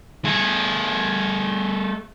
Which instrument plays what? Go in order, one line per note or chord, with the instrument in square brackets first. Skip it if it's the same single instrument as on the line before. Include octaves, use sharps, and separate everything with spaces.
[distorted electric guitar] A3 G#4